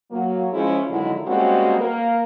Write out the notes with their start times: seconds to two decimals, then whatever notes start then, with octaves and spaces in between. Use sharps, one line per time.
0.10 F#3 A#3
0.52 F3 G#3 C#4 E4 G#4
0.88 F2 D3 D#3 F#3 G#3 E4
1.26 G3 G#3 A#3 C4 C#4 F#4
1.78 A#3 A#4